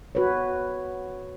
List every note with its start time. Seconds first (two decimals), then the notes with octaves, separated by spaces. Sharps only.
0.15 F#4 B4 C#5